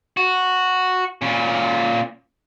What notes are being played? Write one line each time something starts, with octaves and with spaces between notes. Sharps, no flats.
F#4
A#2 C#4